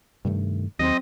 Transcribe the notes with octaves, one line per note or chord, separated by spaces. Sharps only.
G2 C3 D#3 A3
D#2 F#3 C4 D#5